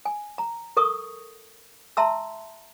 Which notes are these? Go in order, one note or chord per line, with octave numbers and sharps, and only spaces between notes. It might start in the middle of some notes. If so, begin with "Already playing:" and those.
G#5
A#5
A4 A#4 C#6 D#6
E5 A5 A#5 C6 E6